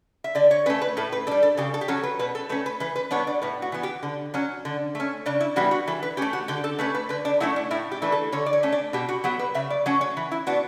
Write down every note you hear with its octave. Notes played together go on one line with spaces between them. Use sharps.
E5
D3 D5
C#5
A3 C#4 B4
B4
A2 A4
B4
G3 D4 A4
A4
C#3 G4
A4
G4
F#3 C#4 A4
B4
B2 B4
A4
A3 C#4 B4
B4
E3 B4
B4
G3 B3 D4 C#5
D5
A2 B4
F#4
E3 B3
G4
D3
F#3 C#4
D3
A3 C#4
C#3 D4
E4
E3 G3 B3 D4 F#4
F#4
E3 A4
B4
A3 C#4 G4
F#4
D3 G4
A4
A3 C#4 B4
B4
D3 B4
D4
F#3 A3 C#4 E4
D4
A2 E4
G4
E3 A3 D4
A4
D3 C#5
D5
C#5
A3 C#4
D4
B2 G4
F#4
F#3 B3 G4
B4
C#3 E5
D5
F#3 A3 C#4 C#5
C#5
E3
E4
B3 D4 F#4